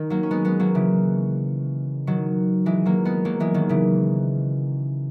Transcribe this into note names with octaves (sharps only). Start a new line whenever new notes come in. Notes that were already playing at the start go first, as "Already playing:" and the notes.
Already playing: D#3
F#3 A#3
C#4
G#3 B3
G#3 B3
F#3 A#3
C#3 E3
D#3 F#3
E3 G#3
F#3 A#3
G#3 B3
F#3 A#3
E3 G#3
D#3 F#3
C#3 E3